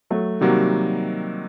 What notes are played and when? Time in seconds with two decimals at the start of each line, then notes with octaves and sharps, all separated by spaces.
0.10 F#3 A3
0.41 C3 D#3 F#3 G3 A#3 F#4